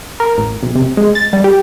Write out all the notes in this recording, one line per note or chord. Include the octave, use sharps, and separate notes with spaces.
A#4
A1
B1
C3
G#3
A6
G3
G4